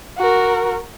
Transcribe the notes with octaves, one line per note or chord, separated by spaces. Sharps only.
F#4 A#4